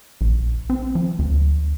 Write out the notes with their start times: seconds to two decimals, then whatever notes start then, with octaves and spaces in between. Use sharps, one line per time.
0.21 A#1
0.70 C4
0.95 F3
1.19 D2